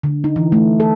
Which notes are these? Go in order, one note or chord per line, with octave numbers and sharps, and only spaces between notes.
D3
D#4
E3
A3
A4